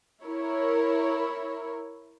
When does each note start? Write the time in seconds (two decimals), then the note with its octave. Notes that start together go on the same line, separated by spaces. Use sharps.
0.25 E4 A#4 C#5